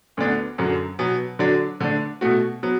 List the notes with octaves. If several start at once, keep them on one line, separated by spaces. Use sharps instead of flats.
D2 D3 B3 D4
F#2 D3 F#3
B2 F#3 B3
D3 F#3 D4
D3 A3 D4
B2 A3 F#4
F#3 B3